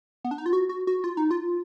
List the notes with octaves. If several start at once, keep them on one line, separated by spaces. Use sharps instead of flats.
B3
D4
D#4
F4
F#4
F#4
F#4
F4
D#4
F4